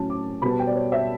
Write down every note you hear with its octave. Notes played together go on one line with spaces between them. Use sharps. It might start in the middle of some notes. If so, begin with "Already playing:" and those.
Already playing: A2 F#3 C#4 A5
D6
B2 G3 B3 B5
A5
G5
D5
C#5
E5